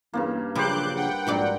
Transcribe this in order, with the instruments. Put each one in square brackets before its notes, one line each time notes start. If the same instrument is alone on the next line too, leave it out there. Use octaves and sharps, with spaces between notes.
[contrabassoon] E2 [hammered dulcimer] G2 C#3 A#3
[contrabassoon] A#1 [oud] C#3 F#3 [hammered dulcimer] G3 C5 [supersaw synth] D6 F#6 G6
[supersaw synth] F#5 G5
[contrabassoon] A#1 [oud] G#2 F#3 D5